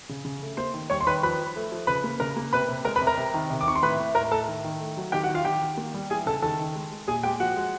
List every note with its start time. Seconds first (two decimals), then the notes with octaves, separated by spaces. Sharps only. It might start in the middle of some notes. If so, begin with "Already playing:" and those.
0.09 C#3
0.25 C#3
0.42 A3
0.57 A#3 C5 C6
0.74 D#3
0.90 G3 C#5 C#6
1.01 C6
1.07 D#3 B4 B5
1.23 F3 B4 B5
1.38 F3
1.56 A3
1.72 F3
1.87 C#3 B4 B5
2.04 A#3
2.20 C#3 A#4 A#5
2.37 A#3
2.53 C3 B4 B5
2.68 C3
2.85 G#3 A#4 A#5
2.96 B4 B5
3.01 C3
3.07 A#4 A#5
3.18 C3
3.34 D#3
3.50 C3
3.61 D6
3.67 D#3 C#6
3.76 C6
3.82 A2 B4 B5
3.99 A2
4.15 A2 A#4 A#5
4.31 A2 A4 A5
4.48 D#3
4.64 D#3
4.80 A3
4.97 F#3
5.12 D#3 G4 G5
5.24 F#4 F#5
5.29 D#3
5.34 F4 F5
5.45 D#3 G4 G5
5.62 D#3
5.77 A#3
5.94 G3
6.10 E3 G#4 G#5
6.26 C#3 A4 A5
6.42 D#3 A4 A5
6.59 D#3
6.75 G#3
6.92 G#3
7.08 A#2 G#4 G#5
7.23 G#3 G4 G5
7.40 F3 F#4 F#5
7.57 G#3